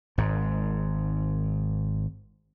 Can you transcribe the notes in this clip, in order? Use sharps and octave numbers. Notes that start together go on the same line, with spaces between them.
G#1 G#2